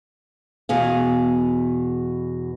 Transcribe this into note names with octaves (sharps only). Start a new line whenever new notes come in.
E2 B2 G#4 F5